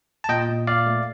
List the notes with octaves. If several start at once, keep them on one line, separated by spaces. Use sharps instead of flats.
A5
A#2 D#5 G5
A#2
A#2 D5 F5
A3